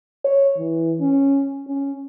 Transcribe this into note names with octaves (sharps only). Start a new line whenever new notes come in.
C#5
E3
C#4
C#4